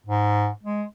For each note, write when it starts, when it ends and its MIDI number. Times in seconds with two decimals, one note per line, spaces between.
0.06 0.50 44
0.63 0.84 56